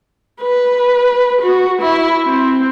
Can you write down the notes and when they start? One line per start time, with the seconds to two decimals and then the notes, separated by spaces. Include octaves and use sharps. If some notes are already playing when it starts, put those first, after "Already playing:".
0.42 B4
1.42 F#4
1.82 E4
2.26 C4